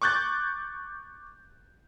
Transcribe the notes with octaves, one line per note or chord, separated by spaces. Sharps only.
C#6 D6 F#6 G6 A6